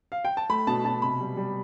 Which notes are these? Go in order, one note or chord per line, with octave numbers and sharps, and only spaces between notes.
F5
G5
A5
A3 B5
B2 A5
B2 A5
C3 B5
G3
G3